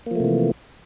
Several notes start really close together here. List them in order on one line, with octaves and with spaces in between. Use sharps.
A#3 F3 A3 C3 E3